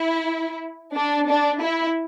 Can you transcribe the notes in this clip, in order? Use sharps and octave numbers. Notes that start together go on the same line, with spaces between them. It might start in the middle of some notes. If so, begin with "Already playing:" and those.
Already playing: E4
D4
D4
E4